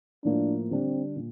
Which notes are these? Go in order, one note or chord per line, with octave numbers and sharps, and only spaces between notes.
A2 F3 A#3 D4 F4
D3 G3 C4 D4
A#2